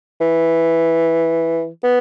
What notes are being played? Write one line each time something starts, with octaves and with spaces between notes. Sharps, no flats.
E3
B3